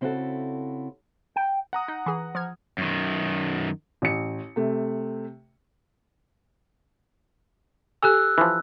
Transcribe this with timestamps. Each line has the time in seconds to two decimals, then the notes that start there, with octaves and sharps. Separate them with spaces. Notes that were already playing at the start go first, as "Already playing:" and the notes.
0.01 C#3 C4 C#4 E4 F#4 A4
1.36 G5
1.73 F#5 A#5 D#6
1.88 D#4
2.06 E3 G#4
2.35 F3 F6 G#6
2.78 F#2 D#3
4.02 A1 C#7
4.56 C3 A3
8.02 G4 A4 G#5 E6 F#6
8.38 E3 F3